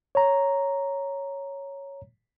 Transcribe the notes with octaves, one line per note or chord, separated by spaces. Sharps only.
C#5 A#5